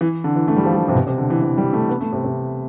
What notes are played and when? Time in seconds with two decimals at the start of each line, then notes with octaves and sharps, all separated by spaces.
0.01 E3
0.24 D3
0.36 E3
0.48 A3
0.56 G3
0.65 F3
0.74 G3
0.88 C3
0.95 B2
1.07 C3
1.18 D3
1.30 E3
1.42 E3
1.57 G3
1.73 A3
1.89 B3
2.01 A3
2.13 C3
2.24 C3